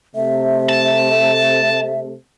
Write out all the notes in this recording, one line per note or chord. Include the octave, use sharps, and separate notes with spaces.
C3 A3 E5
A5